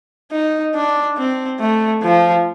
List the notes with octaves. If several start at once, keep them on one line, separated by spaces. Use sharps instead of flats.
D#4
D4
C4
A3
F3